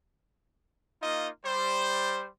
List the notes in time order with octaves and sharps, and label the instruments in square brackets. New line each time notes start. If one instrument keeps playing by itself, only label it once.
[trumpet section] A#3 D#4 F4 D#5
G3 C5